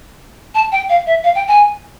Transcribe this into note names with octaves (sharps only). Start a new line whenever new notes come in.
A5
G5
F5
E5
F5
G5
G#5